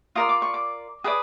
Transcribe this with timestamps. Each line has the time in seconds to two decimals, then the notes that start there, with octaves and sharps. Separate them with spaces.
0.15 F4 A#4 D5 D#6
0.29 D6
0.42 C#6
0.54 D6
1.04 G#4 B4 D5 D#6